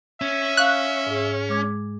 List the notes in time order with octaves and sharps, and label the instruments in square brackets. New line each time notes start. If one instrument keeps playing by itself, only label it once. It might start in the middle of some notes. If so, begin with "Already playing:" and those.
[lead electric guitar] C#4 [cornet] E5
[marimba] F5 C#6 [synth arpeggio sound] F#6
[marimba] G#2 G#4
G#3 D6 G#6